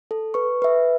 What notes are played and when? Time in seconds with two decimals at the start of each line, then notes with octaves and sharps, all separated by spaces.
0.11 A4
0.34 B4 C#6
0.62 B4 E5